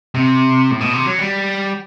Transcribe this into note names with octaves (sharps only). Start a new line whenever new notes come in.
C3
A2
B2
C3
F#3
G3